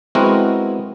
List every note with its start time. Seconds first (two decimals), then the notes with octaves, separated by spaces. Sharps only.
0.15 G#3 B3 C4 E4 F#4 A#4